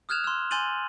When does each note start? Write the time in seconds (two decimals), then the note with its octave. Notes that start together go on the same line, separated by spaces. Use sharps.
0.09 D#6 F6 F#6 G#6 E7 F7
0.24 C6 E6
0.51 G#5 C6 G6 A6 D#7 F#7